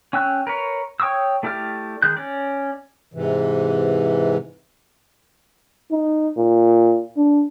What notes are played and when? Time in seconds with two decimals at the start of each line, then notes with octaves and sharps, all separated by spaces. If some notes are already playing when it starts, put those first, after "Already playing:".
0.13 C#4 G5 E6 F#6
0.47 A#4 B4 C#5
1.00 C#5 G5 C#6 D#6 E6
1.43 A3 E4 G4 D5 F6
2.02 D#3 G#3 F#6 G6
2.17 C#4 D5
3.14 G#2 C3 E3
5.91 D#4
6.37 A#2
7.17 D4